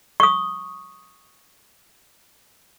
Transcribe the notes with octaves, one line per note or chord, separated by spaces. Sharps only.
C#6 D#6